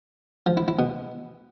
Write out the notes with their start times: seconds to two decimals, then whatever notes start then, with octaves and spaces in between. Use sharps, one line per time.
0.46 F3
0.57 E4
0.68 E4
0.79 B2